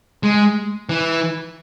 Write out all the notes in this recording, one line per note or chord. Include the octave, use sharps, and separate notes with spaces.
G#3
E3